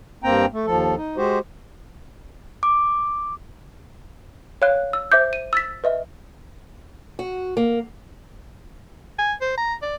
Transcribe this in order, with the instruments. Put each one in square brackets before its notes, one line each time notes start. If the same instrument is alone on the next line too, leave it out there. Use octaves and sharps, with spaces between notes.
[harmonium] G2 A#3 C4 G5 A#5
A3
D#2 F3 A4
D#4
G#3 F#4 G4 C5
[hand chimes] D6
[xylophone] C#5 F5 F#6
E6
C5 E5 D6 G6
D#7
E6 A6 B6
B4 D#5 E5
[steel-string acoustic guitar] F#4
A#3
[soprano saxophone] G#5
C5
A#5
D5